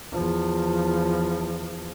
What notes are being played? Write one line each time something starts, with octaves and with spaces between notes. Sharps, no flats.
E2 F3